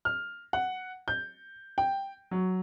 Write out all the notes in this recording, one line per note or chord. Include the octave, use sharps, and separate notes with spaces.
F6
F#5
G6
G5
F#3